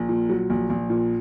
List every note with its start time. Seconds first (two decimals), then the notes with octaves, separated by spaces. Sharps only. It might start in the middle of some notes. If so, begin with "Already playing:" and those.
Already playing: A#1
0.09 A#2
0.29 F#3
0.50 A#1
0.70 A#1
0.90 A#2